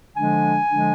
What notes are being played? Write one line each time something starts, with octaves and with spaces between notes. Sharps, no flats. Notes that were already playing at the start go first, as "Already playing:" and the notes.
D3 F3 G#3 D4 G#5
D3 F3 G#3 D4